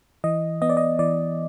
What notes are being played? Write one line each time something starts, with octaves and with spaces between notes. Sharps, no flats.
E3 D#5
B3 D#5
D5
D#5
E3 D5